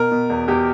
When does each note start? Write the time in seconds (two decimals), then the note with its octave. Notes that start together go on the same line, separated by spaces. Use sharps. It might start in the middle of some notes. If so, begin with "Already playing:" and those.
Already playing: B2 A#4
0.12 B2
0.30 E2
0.48 E2 G4